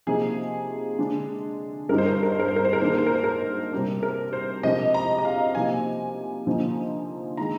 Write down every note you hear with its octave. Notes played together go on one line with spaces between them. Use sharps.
C3 F3 A#3 D#4 G#4
D3 G#3 D4
G2 D3 G3 C4 D#4 A#4
C5
A#4
C5
A#4
C5
A#4
C5
A#4
C5
A#4
G#2 D#3 A#3 D4 C5
A#4
C5
A#4
C5
A#4
C3 G3 D4
A#4
C5
C3 F3 G#3 D4 D#5
A#5
D#5
F5
C3 F3 A#3 D#4 G#5
D3 F3 A#3 D#4
D#3 G#3 A#5